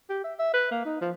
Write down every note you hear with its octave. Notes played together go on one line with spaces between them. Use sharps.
G4
E5
E5
B4
A#3
D#4
F3